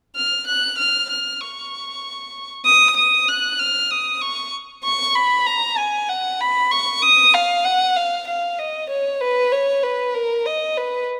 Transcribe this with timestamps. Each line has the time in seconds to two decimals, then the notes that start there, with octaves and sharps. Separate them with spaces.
0.16 F6
0.47 F#6
0.78 F6
1.10 F6
1.41 C#6
2.66 D#6
2.97 D#6
3.28 F#6
3.59 F6
3.91 D#6
4.22 C#6
4.84 C#6
5.15 B5
5.46 A#5
5.78 G#5
6.09 F#5
6.40 B5
6.71 C#6
7.03 D#6
7.34 F5
7.65 F#5
7.96 F5
8.27 F5
8.59 D#5
8.90 C#5
9.21 B4
9.52 C#5
9.83 B4
10.14 A#4
10.46 D#5
10.77 B4